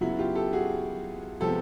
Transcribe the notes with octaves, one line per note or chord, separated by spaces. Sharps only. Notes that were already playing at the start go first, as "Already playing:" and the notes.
C#3 F#3 B3 E4 F#4
F4 G4
G4 A4
F#4 G#4
C3 F3 G#3 B3 G4 A4